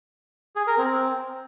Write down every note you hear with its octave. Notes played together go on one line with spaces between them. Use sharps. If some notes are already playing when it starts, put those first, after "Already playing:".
G#4
A#4
C4